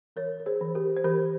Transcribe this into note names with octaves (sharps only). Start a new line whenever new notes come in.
E3 A#4 C#5
A#4
G#4 C5
E3
G4 A#4
C5
E3 G4 A#4